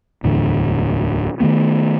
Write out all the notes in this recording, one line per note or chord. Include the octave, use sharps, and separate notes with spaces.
D1 E2 A2 D3
D#3 E3 A3 B3